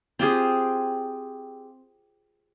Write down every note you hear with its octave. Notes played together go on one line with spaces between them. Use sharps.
C4 F4 G4 G#4